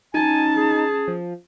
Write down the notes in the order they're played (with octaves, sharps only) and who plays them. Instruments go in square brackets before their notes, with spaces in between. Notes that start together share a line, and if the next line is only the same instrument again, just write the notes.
[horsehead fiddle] C#4 A5 [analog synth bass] D#4 [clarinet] G#5
[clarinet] G#4
[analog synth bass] F3